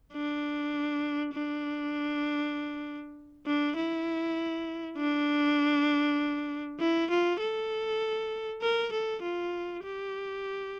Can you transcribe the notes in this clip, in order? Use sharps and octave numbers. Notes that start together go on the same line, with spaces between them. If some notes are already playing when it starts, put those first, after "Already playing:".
D4
D4
D4
E4
D4
E4
F4
A4
A#4
A4
F4
G4